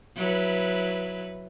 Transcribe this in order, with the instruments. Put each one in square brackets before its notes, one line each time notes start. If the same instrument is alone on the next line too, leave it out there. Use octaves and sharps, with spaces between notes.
[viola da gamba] F#3 E4 B4